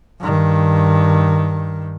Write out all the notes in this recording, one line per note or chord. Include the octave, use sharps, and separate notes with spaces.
G2 D#3